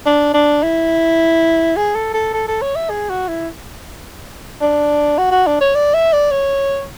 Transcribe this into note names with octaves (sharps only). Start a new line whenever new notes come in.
D4
D4
E4
G#4
A4
A4
A4
A4
C#5
E5
G#4
F#4
E4
D4
F#4
F#4
D4
C#5
D5
E5
D5
C#5